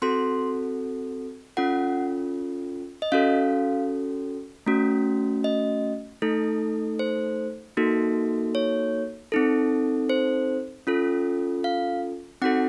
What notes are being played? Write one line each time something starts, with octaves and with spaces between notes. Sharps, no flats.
C4 F#4 A4 C6
C#4 F4 A4 F#5
D#5
C#4 F#4 A4 F5
A3 C#4 F#4
D#5
A3 D#4 A4
C5
A#3 D#4 F#4 A4
C#5
C4 D#4 A4
C5
C#4 F4 A4
F5
C4 D#4 F#4 A4 F#5